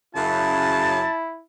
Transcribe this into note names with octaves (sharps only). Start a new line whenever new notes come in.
F#2 C#3 E4 A5